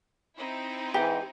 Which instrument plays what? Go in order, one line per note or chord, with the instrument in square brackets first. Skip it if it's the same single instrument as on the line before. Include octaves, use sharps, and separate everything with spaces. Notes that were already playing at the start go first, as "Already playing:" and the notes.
[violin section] C4 D#4 E4
[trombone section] G#2 E3 [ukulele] G4